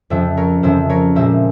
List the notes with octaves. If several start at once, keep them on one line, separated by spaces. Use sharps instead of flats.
F2 C#3 F3 C5 E5
A#4 C#5
F2 C#3 F3 C5 E5
A#4 C#5
A#1 A#2 G#3 C5 E5